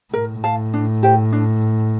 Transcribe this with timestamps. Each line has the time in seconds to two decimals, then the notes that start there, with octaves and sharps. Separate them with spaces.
0.13 A2 A#4
0.44 F5 A5
0.74 D4
1.03 G4 C5 G5
1.33 D4